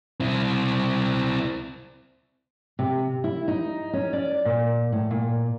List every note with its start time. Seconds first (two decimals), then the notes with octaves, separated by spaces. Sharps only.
0.20 C4 E4
2.79 C3
3.24 E4
3.48 D#4
3.93 C#4
4.13 D5
4.45 A#2
4.92 A2
5.11 A#2